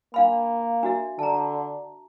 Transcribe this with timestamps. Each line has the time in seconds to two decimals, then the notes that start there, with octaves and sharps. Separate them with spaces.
0.14 A#3 D4 F5 B5
0.83 D4 F#4 E5
1.19 D3 A5 A#5